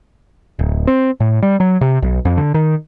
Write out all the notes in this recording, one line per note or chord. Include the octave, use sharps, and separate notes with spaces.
D1
C4
A2
G3
F#3
C3
B1
F2
D3
D#3